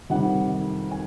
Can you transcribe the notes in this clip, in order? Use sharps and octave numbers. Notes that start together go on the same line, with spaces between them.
F2 C3 D#3 G3 F#5
G#5